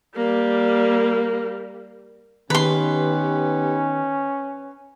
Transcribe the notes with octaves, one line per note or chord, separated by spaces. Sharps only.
G3 A#3
D#3 B3 C#4 D#4 G4 B4 A#5 C6